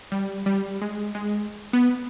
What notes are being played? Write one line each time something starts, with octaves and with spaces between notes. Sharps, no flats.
G3
G3
G#3
G#3
B3